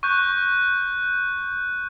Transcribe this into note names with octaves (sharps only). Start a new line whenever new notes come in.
C#6 F#6 G6